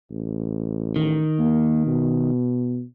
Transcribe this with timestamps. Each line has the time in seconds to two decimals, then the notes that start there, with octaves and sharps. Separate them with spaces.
0.11 A1
0.96 D#3
1.39 A#3
1.87 B2